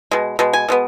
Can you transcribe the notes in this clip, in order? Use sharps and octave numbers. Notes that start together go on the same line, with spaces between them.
B2 G#3
B2 G#3
G#5
B2 G#3 B3